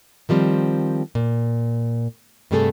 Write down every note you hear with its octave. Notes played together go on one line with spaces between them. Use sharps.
D#3 F3 G3 C4
A#2
G2 C3 G3 A3 G#4 A4